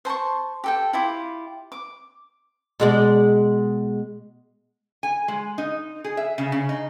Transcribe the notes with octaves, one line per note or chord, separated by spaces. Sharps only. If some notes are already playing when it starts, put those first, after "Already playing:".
C5 A5 C6 C#6
G4 A4 G5
E4 F4 G4
D6
B2 G#3 D5
G#5
G#3
D#4
G#4
E5
C#3
C#3
D#4